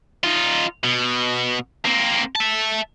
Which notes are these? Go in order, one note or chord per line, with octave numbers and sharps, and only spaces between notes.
D#4 F4
B2
A#3 C4
E5 A5